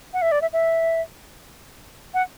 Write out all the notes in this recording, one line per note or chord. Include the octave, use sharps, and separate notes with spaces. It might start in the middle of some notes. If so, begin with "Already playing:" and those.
F#5
E5
D5
E5
E5
F#5